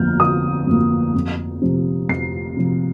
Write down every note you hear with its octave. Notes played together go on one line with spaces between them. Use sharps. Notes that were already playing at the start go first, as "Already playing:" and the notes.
Already playing: G1 F2 F3 A#3 F6 G6
G1 D#6
F2 F3 A#3
F2
C3 F3
F2 C7
C3 F3